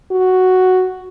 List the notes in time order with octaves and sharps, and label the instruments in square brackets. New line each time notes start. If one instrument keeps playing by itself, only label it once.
[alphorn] F#4